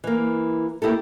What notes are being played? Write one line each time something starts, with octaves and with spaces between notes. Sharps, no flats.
E3 A#3
A#3 E4 G4 A4